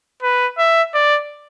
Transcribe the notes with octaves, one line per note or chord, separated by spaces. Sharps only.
B4
E5
D5